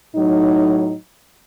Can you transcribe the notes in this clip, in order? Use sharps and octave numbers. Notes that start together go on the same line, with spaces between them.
A2 F#3 D#4